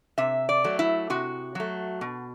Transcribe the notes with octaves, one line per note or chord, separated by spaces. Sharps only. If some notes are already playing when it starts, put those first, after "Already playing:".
C3 E5
D5
F#3 A3
E4
C3 F#4
F#3 A3
B2